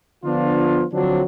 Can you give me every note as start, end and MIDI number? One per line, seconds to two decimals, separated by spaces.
0.25 0.84 50
0.25 0.84 53
0.25 0.84 59
0.25 0.84 62
0.25 0.84 65
0.93 1.23 50
0.93 1.23 53
0.93 1.23 54
0.93 1.23 60
0.93 1.23 62